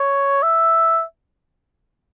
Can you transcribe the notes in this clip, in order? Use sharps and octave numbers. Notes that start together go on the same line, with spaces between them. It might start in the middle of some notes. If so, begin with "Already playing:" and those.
Already playing: C#5
E5